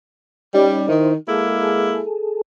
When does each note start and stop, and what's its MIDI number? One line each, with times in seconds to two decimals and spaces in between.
0.55 0.87 55
0.55 0.88 61
0.55 0.88 63
0.55 0.88 67
0.89 1.15 51
0.89 1.14 63
0.89 1.14 64
0.89 1.14 72
1.28 2.04 56
1.28 2.04 58
1.28 2.04 64
1.28 2.41 68
1.28 2.41 69